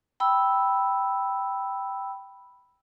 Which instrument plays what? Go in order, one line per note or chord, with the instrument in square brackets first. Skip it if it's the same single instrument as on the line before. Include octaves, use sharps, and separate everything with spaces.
[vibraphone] G5 B5 E6